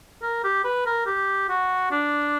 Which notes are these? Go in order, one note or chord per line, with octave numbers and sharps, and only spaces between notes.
A#4
G4
B4
A#4
G4
F#4
D4